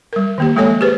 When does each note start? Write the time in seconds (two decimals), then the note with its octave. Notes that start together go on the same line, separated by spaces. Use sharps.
0.13 G3 A#4
0.38 D#3 A#3 G4
0.56 F3 G#3 A#3 A4 C#5 G#5
0.81 G4 G#4 B4 C5